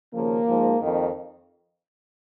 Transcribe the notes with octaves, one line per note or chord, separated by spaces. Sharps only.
D#2 C#3 F3 A#3
G#2 F3
F2 D#3